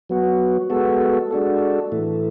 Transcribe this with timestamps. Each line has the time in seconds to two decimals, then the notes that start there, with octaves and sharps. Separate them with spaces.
0.09 F#3 B3 F#4
0.70 G#3 B3 F#4 A4
1.31 G#3 D4 F#4 A4
1.92 A2 E3 A3